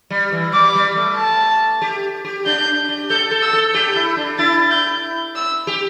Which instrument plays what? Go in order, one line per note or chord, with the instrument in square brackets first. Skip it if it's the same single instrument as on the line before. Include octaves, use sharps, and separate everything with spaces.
[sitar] G3
E3
[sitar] G3 [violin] D6
[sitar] G3
A3
[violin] A5
[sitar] G4
G4
[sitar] D4 [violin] G6
[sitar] G4
[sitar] A4 [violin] G6
[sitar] A4
[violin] E6
[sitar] A4
[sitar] G4 [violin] G6
[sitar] E4
D4
[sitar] E4 [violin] A6
[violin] G6
E6
[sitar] G4